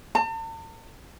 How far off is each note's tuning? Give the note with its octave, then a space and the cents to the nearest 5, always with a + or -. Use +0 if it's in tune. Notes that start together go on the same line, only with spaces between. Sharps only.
A5 +45